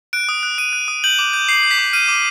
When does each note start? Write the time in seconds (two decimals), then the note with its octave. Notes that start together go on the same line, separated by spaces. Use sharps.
0.13 F#6 D7
0.29 D#6
0.43 F#6
0.58 D#6 D#7
0.73 F#6
0.88 D#6
1.04 G6 F#7
1.19 D6
1.33 G6
1.48 D6 C7
1.64 G6
1.71 B6
1.79 D6
1.93 F6 D#7
2.08 D6